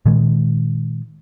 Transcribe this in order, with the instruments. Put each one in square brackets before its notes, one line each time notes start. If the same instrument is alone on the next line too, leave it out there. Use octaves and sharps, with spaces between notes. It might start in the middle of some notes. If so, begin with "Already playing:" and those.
[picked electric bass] A#2 D#3 G#3